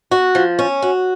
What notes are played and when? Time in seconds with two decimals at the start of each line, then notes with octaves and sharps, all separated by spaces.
0.11 F#4
0.35 F3
0.59 C#4
0.82 F#4